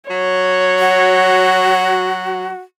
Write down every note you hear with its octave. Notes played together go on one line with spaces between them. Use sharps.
F#3 C#5
F#4